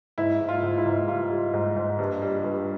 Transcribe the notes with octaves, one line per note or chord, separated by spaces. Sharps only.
G#2 E4
G#2
F4
G#2
E4
G#2
G3 F4
G3
G#2
G#2
G2
G3
G2